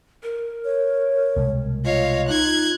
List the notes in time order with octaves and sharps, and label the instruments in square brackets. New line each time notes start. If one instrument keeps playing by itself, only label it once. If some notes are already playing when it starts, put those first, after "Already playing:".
[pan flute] A#4
[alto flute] C#5
[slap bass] C2 B2 G#3
[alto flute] F4 [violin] C#5 F5 [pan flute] D#5
[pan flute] D#4 [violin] F#6 G#6